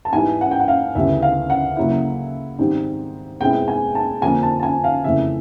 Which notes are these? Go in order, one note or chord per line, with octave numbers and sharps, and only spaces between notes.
A5
G#2 E3 G3 B3 D#4 G#5
F#5
G5
F#5
F5
D2 C#3 E3 G3 B3 E5
F5
F#5
C#3 F#3 A#3 C#4 E4
G#2 D#3 G3 C4
B2 G#3 C4 E4 G5
G#5
A5
F2 D3 F3 A#3 G#5
A5
A5
G#5
F5
F2 C#3 E3 A3 E5